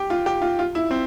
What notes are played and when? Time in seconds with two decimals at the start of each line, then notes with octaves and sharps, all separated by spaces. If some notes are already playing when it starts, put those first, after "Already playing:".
Already playing: G4
0.10 F4
0.26 G4
0.42 F4
0.59 F4
0.75 E4
0.91 C4